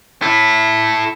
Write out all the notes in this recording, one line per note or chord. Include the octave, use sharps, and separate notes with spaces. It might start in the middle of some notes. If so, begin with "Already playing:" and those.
E4 A4